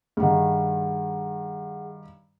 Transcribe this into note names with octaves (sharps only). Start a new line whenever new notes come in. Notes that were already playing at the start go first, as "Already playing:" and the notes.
G2 D#3 G#4 F#5